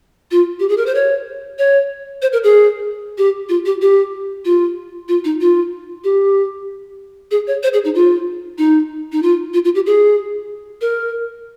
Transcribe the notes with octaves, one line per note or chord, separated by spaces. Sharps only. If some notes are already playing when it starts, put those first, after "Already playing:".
F4
G4
G#4
A#4
C5
C#5
C#5
C5
A#4
G#4
G4
F4
G4
G4
F4
F4
D#4
F4
G4
G#4
C#5
C5
G#4
D#4
F4
D#4
D#4
F4
F4
F4
G4
G#4
A#4